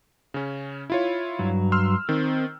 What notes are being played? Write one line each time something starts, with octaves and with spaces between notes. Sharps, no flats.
C#3 C#4
E4 F4 C#5
G2 F#3
C6 E6 F6
D#3 C4